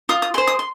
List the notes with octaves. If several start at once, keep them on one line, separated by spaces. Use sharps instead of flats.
F4 D#6
D#6
G#4 C5 C6
D#6
C6